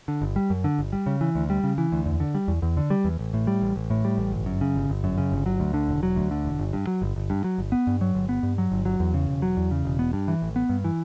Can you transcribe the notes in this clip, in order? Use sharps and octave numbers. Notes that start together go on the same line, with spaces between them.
D3
G1
G3
F#2
D3
G1
G3
C#3
E3
D2
G3
C#3
E3
D2
E2
D3
G3
E2
E2
D3
G3
E2
A1
A2
G3
A1
A1
A2
G3
A1
G1
F#2
C#3
G1
G1
F#2
C#3
G1
F#3
D2
D3
E1
F#3
D2
D3
E1
G1
G2
F#3
G1
G1
G2
F#3
G1
B3
G2
F#3
G1
B3
G2
F#3
G1
F#3
E2
C#3
E1
F#3
E2
C#3
E1
B3
G2
E3
A1
B3
G2
E3